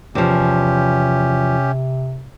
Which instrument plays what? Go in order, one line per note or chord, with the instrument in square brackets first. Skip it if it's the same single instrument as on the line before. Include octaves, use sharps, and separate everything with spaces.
[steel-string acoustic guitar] E2 F3 [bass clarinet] C3 [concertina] C#4 G4